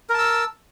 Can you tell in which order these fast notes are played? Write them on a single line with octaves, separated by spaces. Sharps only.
A#4 A5 E6